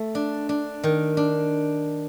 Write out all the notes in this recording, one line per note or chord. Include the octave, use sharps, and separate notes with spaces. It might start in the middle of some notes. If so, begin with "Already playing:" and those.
Already playing: A3
D4
D4
D#3
D4